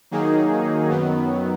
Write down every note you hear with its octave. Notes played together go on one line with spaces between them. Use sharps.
D#3 F#3 A#3 D#4 G#4
F#2 D#3 F#3 B3